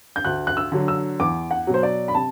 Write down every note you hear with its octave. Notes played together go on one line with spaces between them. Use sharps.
G6
D2 F#6
F#6
E6
D3 F#3
E6
E2 D6
F#5
B2 F#3
C5
D5
B5
C3 A5